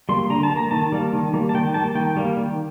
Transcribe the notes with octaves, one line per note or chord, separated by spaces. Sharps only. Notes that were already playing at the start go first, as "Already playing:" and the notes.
G3 A#3 C6
D3 A#5
A5
G3
A#3 A#5
D#3 A5
G3 A#3
D#3
G3 A#3
A5
D#3 G5
G3 A#3 A5
D#3 G5
G3 A#3
D#3